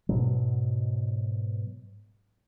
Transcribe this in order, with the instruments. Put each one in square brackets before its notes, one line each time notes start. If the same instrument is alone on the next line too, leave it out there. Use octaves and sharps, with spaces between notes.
[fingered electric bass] G#2 B2 F#3